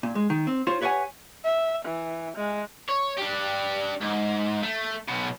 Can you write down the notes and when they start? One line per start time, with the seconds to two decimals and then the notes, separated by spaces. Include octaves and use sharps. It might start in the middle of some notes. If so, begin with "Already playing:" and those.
0.03 A#2
0.15 G#3
0.30 D#3
0.47 C4
0.67 F4 C5 C#5
0.81 G4 B4 C#5 D5 F#5 G#5
1.44 E5
1.85 E3
2.37 G#3
2.89 C#5
3.17 D4 G4
4.01 G#2
4.63 A3
5.08 B1 B2